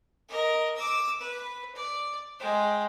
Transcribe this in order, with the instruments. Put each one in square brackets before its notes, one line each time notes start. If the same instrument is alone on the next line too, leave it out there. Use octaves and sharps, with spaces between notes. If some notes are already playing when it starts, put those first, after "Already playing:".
[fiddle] A#4 D#5
D6 E6
B4
D5
G#3 G5